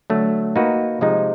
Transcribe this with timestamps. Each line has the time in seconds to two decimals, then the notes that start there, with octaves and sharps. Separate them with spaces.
0.10 D3 F#3 A3
0.56 A#3 D#4 F#4 B4
1.01 C3 F3 G#3 C4 D#4